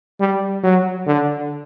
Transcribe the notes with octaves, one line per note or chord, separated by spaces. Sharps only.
G3
F#3
D3